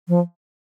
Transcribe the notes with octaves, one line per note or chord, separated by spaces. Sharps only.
F3